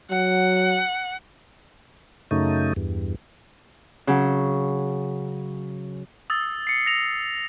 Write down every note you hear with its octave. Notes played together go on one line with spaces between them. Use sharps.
F#3 F#5
F#2 C#3 A3 D#4
E2 G2
C#3 F#3
D#6 E6 A6
C7 C#7
A#6 C7 F7